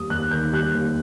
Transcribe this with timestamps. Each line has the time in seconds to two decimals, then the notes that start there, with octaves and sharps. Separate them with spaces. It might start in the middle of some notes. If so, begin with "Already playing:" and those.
Already playing: D#2 G3 D#6
0.10 D#2 F#6
0.31 D#3 G6
0.52 G3 F#6
0.75 D#2